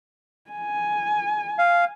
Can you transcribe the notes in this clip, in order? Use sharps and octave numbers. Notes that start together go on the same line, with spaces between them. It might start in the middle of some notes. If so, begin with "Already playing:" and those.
G#5
F5